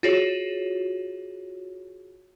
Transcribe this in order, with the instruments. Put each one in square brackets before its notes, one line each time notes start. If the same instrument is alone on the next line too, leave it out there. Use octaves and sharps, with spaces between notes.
[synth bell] F4 F#4 G#4 C#5